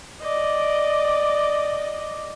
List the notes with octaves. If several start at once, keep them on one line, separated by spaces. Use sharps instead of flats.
D5 D#5